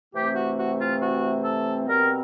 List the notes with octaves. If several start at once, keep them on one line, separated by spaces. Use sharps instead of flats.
C3 E3 A3 C4 G4
F#4
F#4
F4
F#4
A4
B2 G3 C4 A#4